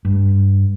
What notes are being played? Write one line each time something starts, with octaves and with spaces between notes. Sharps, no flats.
G2